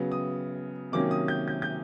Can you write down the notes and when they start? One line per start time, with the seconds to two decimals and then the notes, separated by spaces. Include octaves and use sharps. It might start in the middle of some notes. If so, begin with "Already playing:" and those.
Already playing: C#3 F#3 B3
0.12 D#6
0.92 C3 D#3 F#3 A#3 C#4 D6
1.11 D#6
1.28 G6
1.48 G6
1.62 G6